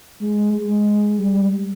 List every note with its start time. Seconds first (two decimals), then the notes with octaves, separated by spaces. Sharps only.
0.21 G#3
0.54 G#3
1.18 G3